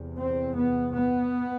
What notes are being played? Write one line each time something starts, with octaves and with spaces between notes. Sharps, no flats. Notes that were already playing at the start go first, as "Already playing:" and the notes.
Already playing: E2 C3
C4
B3
B3